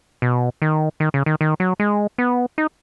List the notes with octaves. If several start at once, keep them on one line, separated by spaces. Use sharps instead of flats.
B2
D#3
D#3
C#3
D#3
D#3
F#3
G#3
B3
D#4